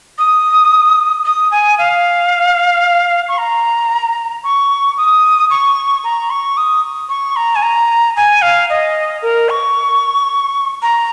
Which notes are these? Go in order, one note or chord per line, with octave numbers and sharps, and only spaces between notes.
D#6
D#6
G#5
F5
C#6
A#5
C#6
D#6
C#6
A#5
C#6
D#6
C#6
A#5
G#5
A#5
G#5
F5
D#5
A#4
C#6
A#5